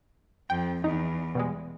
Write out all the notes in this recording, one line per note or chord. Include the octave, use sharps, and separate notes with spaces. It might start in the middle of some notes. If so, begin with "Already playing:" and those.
F2 G5
E2 D#4
B2 G3 G#3